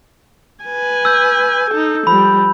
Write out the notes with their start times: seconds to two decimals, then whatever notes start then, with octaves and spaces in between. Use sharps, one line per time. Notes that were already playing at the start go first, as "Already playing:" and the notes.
0.64 B4 G#5
1.05 E6 G6
1.70 D#4 A4
2.07 F3 G3 B5